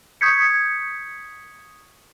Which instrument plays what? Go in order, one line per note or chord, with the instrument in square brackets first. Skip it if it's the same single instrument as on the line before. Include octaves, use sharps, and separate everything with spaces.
[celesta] C#6 D#6 G6 G#6 B6 C#7